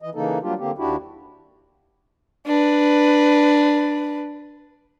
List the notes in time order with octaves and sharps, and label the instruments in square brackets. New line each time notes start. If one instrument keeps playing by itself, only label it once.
[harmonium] E3 D#5
C#3 E3 A#3 D#4 A4
F#3 G3 A#3 D4 F4 G4
D3 A#3 C4 G4
D#2 D4 E4 F#4 G4
[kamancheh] D4 B4